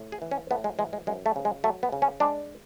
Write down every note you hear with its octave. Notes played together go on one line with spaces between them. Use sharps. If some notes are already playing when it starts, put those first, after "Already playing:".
Already playing: A2
G#4
E3
C#4
A2 B3
G#3
E3 G#3
G#3
F#2 G#3
A3
C#3
G#3
F#3 A3
B3
C#3
C#4
G#3 D4